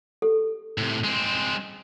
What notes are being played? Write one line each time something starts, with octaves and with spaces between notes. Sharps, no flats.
G4 A4
A2 C3
G#3 C4